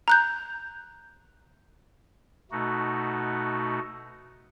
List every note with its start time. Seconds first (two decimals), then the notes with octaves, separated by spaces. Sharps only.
0.08 A#5 F#6 G6
2.51 B2 A3 D#4 F#4